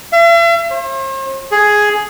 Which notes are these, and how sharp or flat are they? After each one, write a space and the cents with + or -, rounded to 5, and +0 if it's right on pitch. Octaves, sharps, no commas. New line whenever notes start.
E5 +45
C5 +45
G#4 +5